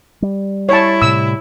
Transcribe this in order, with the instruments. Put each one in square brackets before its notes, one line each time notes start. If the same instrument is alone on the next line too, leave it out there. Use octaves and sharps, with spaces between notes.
[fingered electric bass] G3
[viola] E4 [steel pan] C#5 A5
[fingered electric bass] A2 C3 G3 [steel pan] E6